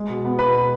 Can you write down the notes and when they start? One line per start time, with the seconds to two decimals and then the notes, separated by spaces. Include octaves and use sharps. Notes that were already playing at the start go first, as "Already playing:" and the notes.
Already playing: G#3
0.09 B2
0.25 B3
0.39 B2 B4 B5
0.54 B2